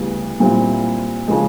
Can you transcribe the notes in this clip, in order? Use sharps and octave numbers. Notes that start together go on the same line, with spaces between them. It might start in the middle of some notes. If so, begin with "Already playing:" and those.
Already playing: D2 C#3 E3 G3 B3
A#2 G3 C4 E4
C#3 F3 G#3